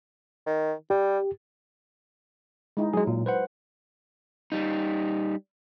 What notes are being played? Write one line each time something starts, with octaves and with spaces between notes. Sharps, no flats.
D#3
G3 G4
G#3 D#4 E4
F#3 G#3 G#4
A#2
B4 C5 F#5
G3 D#4